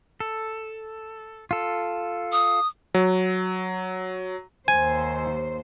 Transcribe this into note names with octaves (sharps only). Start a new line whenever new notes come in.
A4
F4 A4
D#6
F#3
D#2 C5 G#5